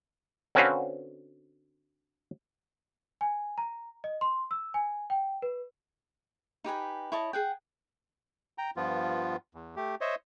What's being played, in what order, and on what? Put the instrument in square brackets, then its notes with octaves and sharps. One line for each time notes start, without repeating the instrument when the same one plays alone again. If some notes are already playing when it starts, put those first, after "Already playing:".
[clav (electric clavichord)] D3 C4 C#4 F#4 B4 F5
[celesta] G#5
A#5
D#5
C6
E6
G#5
G5
B4
[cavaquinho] D#4 G4 B4 G#5
E4 C#5 D#5 A5
G#4 F#5 G5
[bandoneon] G5 A#5
G2 F3 B3 F4
E2
A3 G4
C5 C#5 D#5 E5